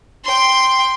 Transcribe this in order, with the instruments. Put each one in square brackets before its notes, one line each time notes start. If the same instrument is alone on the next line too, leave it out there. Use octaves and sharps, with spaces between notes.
[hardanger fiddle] G5 C6